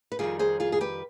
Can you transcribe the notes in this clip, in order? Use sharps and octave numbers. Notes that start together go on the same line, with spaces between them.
B4
F2 D#3 G3 F4 G#4
G#4 C5
F4 G#4
G#4
G4 B4